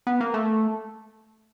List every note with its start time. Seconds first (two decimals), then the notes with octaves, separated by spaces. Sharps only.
0.07 B3
0.20 A#3
0.34 A3